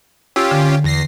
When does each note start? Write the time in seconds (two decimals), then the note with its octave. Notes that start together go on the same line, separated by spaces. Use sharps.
0.36 C#4 F4 G4 E6
0.51 D3
0.84 E2 A#6 C7